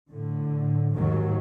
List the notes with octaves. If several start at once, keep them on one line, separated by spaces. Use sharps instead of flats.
A2 D3
D#2 G#2 D#3 F#3